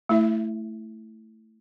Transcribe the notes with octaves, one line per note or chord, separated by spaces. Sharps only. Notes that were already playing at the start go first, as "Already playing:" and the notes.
A3 E4 E5